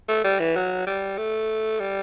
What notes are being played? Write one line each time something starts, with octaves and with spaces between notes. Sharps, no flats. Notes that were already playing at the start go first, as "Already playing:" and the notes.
A3
G3
E3
F#3
G3
A3
G3